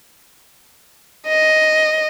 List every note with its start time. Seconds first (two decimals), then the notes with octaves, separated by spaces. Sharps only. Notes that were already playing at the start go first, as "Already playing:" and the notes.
1.28 D#5